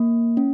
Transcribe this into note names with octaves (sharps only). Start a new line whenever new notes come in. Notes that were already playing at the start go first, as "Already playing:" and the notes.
Already playing: A#3
C#4